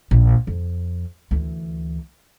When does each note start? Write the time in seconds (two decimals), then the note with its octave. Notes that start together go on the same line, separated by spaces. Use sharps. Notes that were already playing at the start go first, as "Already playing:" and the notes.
0.11 A#1
0.47 F2
1.31 D2 E3